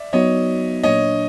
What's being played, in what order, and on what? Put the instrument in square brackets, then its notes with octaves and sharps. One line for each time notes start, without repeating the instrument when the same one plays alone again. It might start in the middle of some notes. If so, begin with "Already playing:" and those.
Already playing: [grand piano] D5 E5
[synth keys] F#3 B3 D#4 F#4 [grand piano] C#5 D#5
[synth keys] A#2 F#3 A#3 D4 [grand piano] C#5 D#5